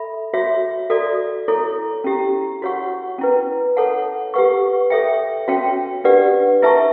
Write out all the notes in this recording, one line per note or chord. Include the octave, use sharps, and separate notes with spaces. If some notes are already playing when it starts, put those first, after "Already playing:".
Already playing: A4 E5 B5
F#4 C#5 E5
F#4 A4 D5
E4 A4 C#5
C#4 E4 G4
F#4 C#5 F#5 C#6
C#4 E4 B4
A4 C#5 F#5 A5
G4 B4 F#5 C#6
A4 C#5 E5 G5
C#4 F#4 C#5 G5
D4 G4 B4 D5 F#5
E4 B4 E5 A5 C#6